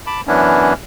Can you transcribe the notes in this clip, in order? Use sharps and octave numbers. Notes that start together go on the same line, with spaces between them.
A5 B5 D6
F#2 E3 B3 C#4 D4 E4